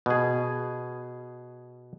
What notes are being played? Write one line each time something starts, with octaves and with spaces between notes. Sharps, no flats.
B2 G#4